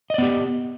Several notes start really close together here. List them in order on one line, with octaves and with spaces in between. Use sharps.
D#5 D5 B3 G4